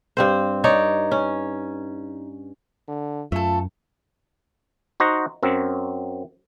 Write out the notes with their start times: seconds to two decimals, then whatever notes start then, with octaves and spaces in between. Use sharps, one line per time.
0.17 G2 C4 C5
0.64 D#4 C#5 D5
1.11 C#4
2.88 D3
3.32 F#2 A3 F4 A4
5.00 D#4 F#4 C5 D#5 F#5 A#5
5.43 F#2 F#3 C4